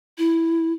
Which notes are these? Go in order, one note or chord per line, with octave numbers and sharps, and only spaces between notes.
E4